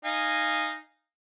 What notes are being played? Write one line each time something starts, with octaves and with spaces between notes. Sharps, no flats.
D#4 F5 G#5